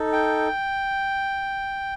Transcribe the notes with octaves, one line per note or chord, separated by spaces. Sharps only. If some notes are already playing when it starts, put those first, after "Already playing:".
Already playing: D#4 A4
G5